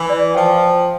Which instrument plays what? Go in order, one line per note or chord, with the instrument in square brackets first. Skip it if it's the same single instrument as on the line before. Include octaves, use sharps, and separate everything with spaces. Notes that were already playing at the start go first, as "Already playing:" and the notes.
Already playing: [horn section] E3
[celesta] D5
[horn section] F3 [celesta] G5